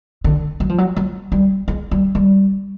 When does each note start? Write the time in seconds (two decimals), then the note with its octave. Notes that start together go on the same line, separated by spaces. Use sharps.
0.24 D3
0.60 F#3
0.69 F3
0.78 F#3
0.96 F#3
1.32 G3
1.68 G#3
1.91 G3
2.15 G3